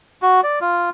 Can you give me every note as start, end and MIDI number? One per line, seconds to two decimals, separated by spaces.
0.22 0.41 66
0.43 0.59 74
0.61 0.90 65